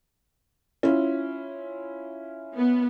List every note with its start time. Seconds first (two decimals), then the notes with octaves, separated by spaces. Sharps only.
0.83 C#4 E4 F4
2.55 B3